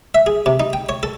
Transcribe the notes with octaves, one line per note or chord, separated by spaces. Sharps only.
E5
G#4
C3
D#4
G5
C#5
A4